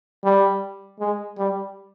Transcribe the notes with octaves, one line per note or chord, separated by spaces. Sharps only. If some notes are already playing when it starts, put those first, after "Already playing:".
G3
G#3
G3